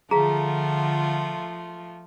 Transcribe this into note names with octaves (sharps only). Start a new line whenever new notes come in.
D3 F3 A3 F4 G#4 F5 A#5